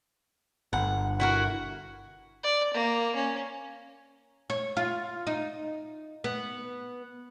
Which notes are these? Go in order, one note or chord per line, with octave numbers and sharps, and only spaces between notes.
G1 F#5
E4 F#4 A#4 F#5
D5
A#3
C#4
C#5
F4
D#4
B3